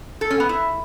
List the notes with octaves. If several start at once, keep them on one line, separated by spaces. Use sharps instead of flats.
A4
C#4
B3
E4